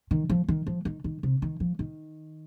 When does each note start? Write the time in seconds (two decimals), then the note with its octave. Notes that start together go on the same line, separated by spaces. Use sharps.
0.11 D#3
0.30 F3
0.48 D#3
0.67 F3
0.85 D#3
1.04 D#3
1.23 C3
1.42 D#3
1.60 F3
1.79 D#3